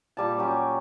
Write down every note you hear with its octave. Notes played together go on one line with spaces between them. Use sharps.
A#2 G3 A5
F#3 C#4 G4